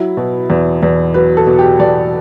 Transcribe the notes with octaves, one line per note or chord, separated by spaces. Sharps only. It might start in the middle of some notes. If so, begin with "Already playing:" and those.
Already playing: F#3 E4
B2
E2
E2
F#3 B4
A4
B2
G4
E2 D5